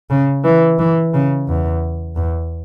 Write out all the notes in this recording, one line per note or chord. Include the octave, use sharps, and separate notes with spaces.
C#3
E3
E3
C#3
E2
E2